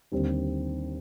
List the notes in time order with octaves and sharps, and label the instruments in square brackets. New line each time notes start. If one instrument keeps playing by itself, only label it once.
[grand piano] D#2 D3 G3 C4